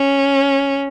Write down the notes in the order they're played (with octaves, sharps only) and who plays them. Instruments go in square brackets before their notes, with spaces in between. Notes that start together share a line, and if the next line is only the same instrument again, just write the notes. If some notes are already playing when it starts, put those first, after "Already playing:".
Already playing: [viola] C#4